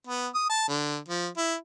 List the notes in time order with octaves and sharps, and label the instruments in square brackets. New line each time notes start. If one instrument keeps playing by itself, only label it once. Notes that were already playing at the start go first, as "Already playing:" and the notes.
[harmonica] B3
D#6
A5
D3
F3
E4